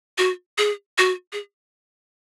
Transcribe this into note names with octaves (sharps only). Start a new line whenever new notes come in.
F#4
G#4
F#4
G#4